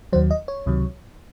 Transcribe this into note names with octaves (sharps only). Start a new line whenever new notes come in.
D#2 D#3 F#3 C5
D#5
C#5
C#2 C3 D#3 F#3